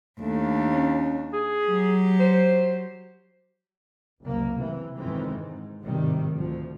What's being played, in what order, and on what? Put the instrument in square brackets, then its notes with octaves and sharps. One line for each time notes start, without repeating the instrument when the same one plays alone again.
[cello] D#2 D4 [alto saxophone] A3
[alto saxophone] C#4
G#4
[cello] F#3 G4
[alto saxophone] C5
[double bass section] F#1 C2 A#3
C3 E3
G1 F2 D#3 E3 G#3 C4
G#2
G#1 A2 C3 D#3 G3
D2 F3